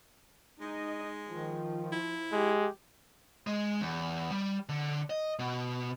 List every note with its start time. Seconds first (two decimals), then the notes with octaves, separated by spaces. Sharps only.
0.61 G#3 D#4 D#5
1.29 D#3 F3
1.92 E4
2.32 G#3 G4
3.47 G#3
3.81 E2
4.31 G3
4.69 D3
5.10 D#5
5.39 B2